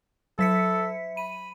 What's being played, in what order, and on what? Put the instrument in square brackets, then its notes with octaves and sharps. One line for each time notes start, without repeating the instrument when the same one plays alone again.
[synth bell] F#3 B6 C#7 [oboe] A4 [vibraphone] E5
[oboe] B5 [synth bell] D#7